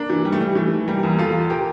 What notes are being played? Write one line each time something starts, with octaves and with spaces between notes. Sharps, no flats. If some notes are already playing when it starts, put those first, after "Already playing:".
Already playing: A#3 D4
E3
G3
A3
G3
E3 A3
G3 A#3
E2
F4 A4
G4 A#4